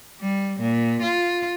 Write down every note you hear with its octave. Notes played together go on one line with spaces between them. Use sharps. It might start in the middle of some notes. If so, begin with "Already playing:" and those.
G3
A#2
F4